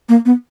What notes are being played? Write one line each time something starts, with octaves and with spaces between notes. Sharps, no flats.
A#3
B3